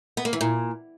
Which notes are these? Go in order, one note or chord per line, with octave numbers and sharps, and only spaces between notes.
B3
A#3
E3
A#2